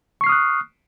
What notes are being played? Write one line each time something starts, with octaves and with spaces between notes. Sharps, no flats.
C#6 D#6 F6 F#6 C7